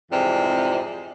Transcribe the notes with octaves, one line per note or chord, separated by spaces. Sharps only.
F2 G#2 C3 E3 G3